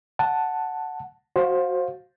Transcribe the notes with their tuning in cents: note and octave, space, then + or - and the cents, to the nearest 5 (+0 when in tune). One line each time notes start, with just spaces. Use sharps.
F#5 +0 A5 +0
F#4 +0 C5 +15 F5 +15